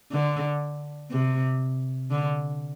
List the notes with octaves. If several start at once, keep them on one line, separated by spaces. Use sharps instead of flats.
D3
C3
D3